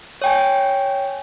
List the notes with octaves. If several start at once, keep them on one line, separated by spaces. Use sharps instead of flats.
C#5 G5 G#5